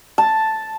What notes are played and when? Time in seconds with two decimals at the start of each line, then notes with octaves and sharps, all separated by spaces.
0.18 A5